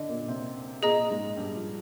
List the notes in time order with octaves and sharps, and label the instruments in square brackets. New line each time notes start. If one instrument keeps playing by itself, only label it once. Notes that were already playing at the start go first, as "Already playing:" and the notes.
Already playing: [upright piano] D3 D4 [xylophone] D#5
[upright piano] A#2 A#3
C3 C4
[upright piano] A#2 A#3 [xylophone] G#4 D#5 A#5
[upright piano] G#2 G#3
G2 G3
F3